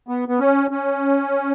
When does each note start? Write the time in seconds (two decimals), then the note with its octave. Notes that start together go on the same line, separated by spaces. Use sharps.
0.08 B3
0.29 B3
0.40 C#4
0.71 C#4